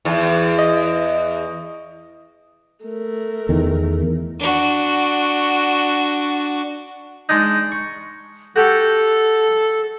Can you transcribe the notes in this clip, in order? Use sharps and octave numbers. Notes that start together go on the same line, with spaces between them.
E2
D#5
A3 A#4
E2 D#3
D4 F#4
G#3 D4 D#4
C#6
F#4 G4 A4 F#5